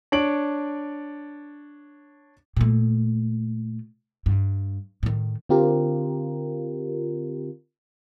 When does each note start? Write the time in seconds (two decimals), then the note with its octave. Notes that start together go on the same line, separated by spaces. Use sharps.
0.12 D4 C#5 D7 F#7
2.57 A#2 A3
4.26 G2
5.03 A2 D#3
5.49 D3 C4 F4 G4 A#4